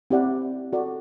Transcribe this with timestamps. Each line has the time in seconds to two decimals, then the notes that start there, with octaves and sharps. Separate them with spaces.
0.11 C4 E4 G4 D5 F#5
0.73 F#4 A4 D5